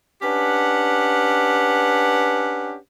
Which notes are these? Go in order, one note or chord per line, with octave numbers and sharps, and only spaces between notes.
C#4 D4 G4 B4 F#5